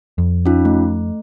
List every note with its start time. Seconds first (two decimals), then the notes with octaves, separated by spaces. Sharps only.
0.18 F2
0.46 C#4 D#4 F4
0.65 A3